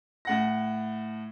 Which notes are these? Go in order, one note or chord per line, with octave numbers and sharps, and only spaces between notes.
A2 F#5 A#6